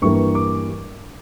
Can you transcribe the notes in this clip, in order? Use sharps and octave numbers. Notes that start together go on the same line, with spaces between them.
G2 E3 G3 A#3 C#6
D6